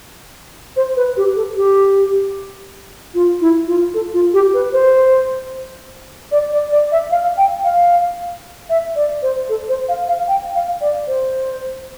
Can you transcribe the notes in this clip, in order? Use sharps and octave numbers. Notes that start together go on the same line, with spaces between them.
C5
B4
G4
A4
G4
F4
E4
F4
A4
F4
G4
B4
C5
D5
D5
D5
E5
F5
G5
F5
E5
D5
C5
A4
C5
F5
F5
G5
F5
D5
C5